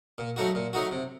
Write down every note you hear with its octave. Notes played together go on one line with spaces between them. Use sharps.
A#2
F#3 A3 D#4 F#4
A#2
F#3 A3 D#4 F#4
C3